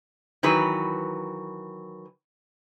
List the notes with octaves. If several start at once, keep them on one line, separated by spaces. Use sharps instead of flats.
D#3 E3 F#3 B4